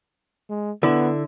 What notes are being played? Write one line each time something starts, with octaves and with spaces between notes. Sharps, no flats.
G#3
D3 B3 E4